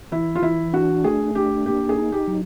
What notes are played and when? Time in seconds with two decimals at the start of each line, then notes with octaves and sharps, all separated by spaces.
0.12 E3 E4
0.35 F4
0.42 E3 E4
0.73 D4 F#4
1.04 A3 G#4
1.35 D4 G4
1.66 A#3 G4
1.89 G#4
1.96 D#4
2.12 G4
2.28 F#3